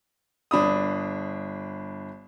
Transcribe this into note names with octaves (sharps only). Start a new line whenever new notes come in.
G1 D4 B5 D#6